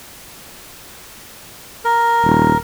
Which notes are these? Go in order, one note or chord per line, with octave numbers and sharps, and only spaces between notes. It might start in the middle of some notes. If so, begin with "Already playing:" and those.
A#4
D#1